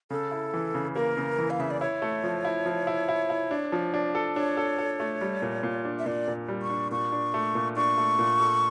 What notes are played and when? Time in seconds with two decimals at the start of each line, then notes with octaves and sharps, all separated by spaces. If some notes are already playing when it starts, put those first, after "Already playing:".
0.10 C#3 A4
0.31 E4
0.54 E3
0.74 C#3
0.95 A#3 A#4
1.17 C#3
1.38 E3
1.50 F5
1.59 C#3 E5
1.70 D5
1.81 E4 C#5
2.02 A3
2.24 F3
2.45 E4
2.66 F3
2.87 E4
3.08 E4
3.30 E4
3.51 D4
3.72 F3
3.94 D4
4.15 A4
4.36 D4 C#5
4.57 A4
4.78 A4
5.00 A3
5.21 G3
5.42 A#2
5.63 A#2
5.85 D4
5.99 E5
6.06 A#2 D5
6.28 A#2
6.48 G3
6.62 C#6
6.70 D4
6.91 A#2 C#6
7.12 D4
7.34 A3
7.55 A#2
7.76 D4 C#6
7.98 A3
8.19 A#2
8.40 A4